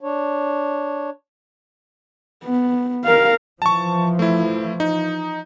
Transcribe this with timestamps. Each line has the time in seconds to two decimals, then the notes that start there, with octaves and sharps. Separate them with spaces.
0.01 D4 C#5
2.44 B3
3.05 A#4 F5
3.62 E3 F3 A5 C#6
4.19 A3 E4
4.80 D#4